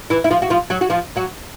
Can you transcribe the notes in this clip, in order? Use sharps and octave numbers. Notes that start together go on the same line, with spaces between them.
E3 E4
E4
F3 F4
F#4
F3 F4
F#3 F#4
F#4
F3 F4
F#3 F#4